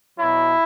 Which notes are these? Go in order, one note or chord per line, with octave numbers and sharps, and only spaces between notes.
B2 F#3 E4